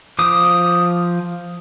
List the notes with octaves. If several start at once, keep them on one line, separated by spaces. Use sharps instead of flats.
F3 D6 D#6